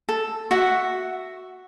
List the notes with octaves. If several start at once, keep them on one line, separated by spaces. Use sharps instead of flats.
A4
F#4 E5 F#5